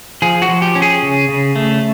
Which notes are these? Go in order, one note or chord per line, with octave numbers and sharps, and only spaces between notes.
F3 G#4
F#4
F3
G4
C#4
G#4
C#3
C#3
A3